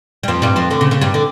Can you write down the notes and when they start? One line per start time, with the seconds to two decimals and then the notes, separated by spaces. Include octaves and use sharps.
0.23 G3
0.28 F2 F3
0.42 G2 G3
0.56 F2 F3
0.70 D2 D3
0.81 C#3
0.91 C#3
1.01 G2 G3
1.14 D3